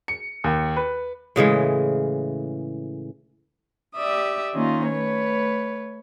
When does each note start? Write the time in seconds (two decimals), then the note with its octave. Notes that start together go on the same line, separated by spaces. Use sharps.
0.08 C#7
0.44 D#2
0.76 B4
1.36 A2 C#3 E3 G#3
3.95 G4 D5 E5 D#6
4.54 D#3 A#3 C#4 D#4 F4
4.87 A3 B4 C#5